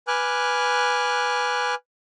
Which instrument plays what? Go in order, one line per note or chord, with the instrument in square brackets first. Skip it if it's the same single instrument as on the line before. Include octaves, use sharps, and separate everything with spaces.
[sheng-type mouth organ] B4 G#5 D6 F6 F#6